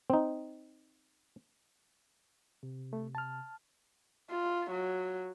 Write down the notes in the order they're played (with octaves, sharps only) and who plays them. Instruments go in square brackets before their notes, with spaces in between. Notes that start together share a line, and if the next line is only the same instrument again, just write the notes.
[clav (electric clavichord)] C4 D#4
[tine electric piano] C3
[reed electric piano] A3
A5 F6
[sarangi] F4
F#3